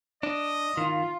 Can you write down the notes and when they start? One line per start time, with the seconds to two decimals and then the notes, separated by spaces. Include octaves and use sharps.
0.23 D4 D#5
0.77 D#3 F4